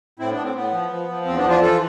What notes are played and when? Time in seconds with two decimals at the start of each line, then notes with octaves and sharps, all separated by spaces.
0.19 A2 C4 E4
0.31 B3 D4
0.37 A2
0.43 C4
0.55 A2 B3
0.72 F3
0.90 F3
1.08 F3
1.25 E2 C4
1.37 B3 D4
1.44 F3
1.49 D4 F4
1.61 E3 F4 A4